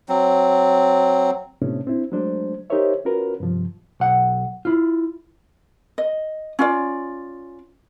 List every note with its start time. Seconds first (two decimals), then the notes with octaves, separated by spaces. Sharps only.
0.09 F#3 C4
1.62 A2 C3 B3 C#4 D4
1.87 C4 D4 E4
2.12 F#3 G#3 A3 D4 C5
2.70 D#4 G4 A#4 C5 C#5 E5
3.05 C#4 F4 F#4 A#4 B4
3.40 G2 C3 F3
4.00 B1 F#5
4.65 E4 F4
5.98 D#5
6.59 C#4 F4 D5